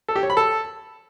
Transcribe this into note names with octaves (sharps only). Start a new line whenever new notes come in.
A4
G4
C#5
B5
A4